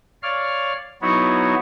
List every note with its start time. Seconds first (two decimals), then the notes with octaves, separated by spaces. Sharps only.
0.23 C#5 D5 F5 F6
1.02 F#3 B3 D#4 E4 F#4 C#5